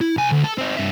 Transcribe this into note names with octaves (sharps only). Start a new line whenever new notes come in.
E4
C2 G#5
D2
A4
C4 D#4
G2 E5